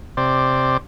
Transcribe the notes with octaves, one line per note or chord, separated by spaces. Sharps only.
C3 C5 D5